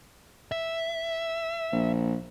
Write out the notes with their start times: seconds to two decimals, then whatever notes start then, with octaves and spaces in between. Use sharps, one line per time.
0.52 E5
1.72 A#1